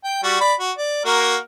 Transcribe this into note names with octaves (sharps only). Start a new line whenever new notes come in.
G5
G3 F#4
D5 B5
F#4
D5
A#3 F#4 A#4